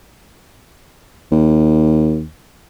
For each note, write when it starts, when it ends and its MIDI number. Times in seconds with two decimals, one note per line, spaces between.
1.32 2.25 39